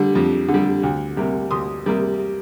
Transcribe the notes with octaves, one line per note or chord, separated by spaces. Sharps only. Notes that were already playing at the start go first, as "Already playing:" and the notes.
Already playing: D3 G3
F2
D3
G3
D2
C3 G3 A#3
D2 C6 D#6
C3 G3 A#3